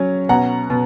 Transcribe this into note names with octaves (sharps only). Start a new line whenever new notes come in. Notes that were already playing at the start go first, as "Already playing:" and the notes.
Already playing: F#3 C#4
B2 F#5 A#5
B2